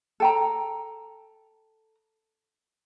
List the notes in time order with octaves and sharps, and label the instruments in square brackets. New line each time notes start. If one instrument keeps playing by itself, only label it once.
[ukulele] A4 G5 A#5